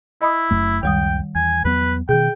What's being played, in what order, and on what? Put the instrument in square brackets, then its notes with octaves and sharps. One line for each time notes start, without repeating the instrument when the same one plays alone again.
[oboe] E4 [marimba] D#5 B5 D#6
[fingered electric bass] F#1 F#2 A3
[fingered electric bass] C#2 F#2 [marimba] D#3 G3 D#6 [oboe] G5
[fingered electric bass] E2 [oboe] G#5
[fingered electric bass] E2 F#3 B3 [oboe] B4
[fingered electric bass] B2 D#3 [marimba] G#4 [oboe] G5